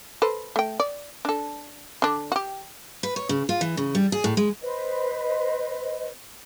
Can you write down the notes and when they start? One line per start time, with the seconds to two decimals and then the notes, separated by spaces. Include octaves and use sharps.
0.22 A4 B4 C5
0.56 A3 G5
0.80 D5
1.25 D4 A4
2.02 D3 D4
2.32 F#4 G4
3.03 B4
3.16 C#5
3.29 C#3
3.49 F4
3.61 E3
3.77 C#3
3.95 G3
4.12 G#4
4.24 A2
4.37 G#3
4.62 B4 C5 D#5